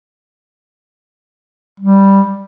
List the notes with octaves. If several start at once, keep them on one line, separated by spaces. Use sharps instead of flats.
G3